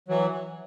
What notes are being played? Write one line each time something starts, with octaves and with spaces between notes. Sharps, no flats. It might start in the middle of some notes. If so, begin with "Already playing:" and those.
E3 F#3